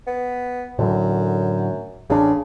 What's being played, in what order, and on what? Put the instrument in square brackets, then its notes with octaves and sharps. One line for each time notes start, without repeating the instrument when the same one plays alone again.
[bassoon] B3
[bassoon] F#2 [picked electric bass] A2 D3 F#3
[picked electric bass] A1 D4 [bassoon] C#3